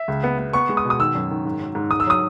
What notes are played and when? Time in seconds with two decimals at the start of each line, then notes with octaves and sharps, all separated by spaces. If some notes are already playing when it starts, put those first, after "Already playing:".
Already playing: E5
0.08 C#2
0.24 B3
0.39 B3
0.53 B3 C#6
0.69 G#3
0.77 D#6
0.85 B2
0.90 D#6
0.99 D#3 E6
1.15 F#2
1.31 D#3
1.45 G#2
1.61 F#3
1.75 G#2
1.91 G#2 D#6
2.00 E6
2.07 F#3 D#6